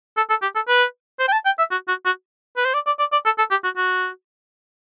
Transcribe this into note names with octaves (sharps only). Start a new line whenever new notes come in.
A4
A4
G4
A4
B4
C5
G5
A5
G5
E5
F#4
F#4
F#4
B4
C5
D5
D5
D5
D5
A4
A4
G4
F#4
F#4